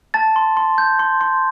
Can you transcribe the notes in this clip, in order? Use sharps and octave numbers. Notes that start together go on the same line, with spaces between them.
A5 A6
C6
C6
G6
C6
C6